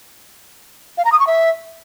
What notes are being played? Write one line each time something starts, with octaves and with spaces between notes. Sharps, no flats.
F5
A#5
D#6
C#6
E5